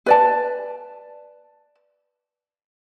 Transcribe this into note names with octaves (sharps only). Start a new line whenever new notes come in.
B4 D5 A5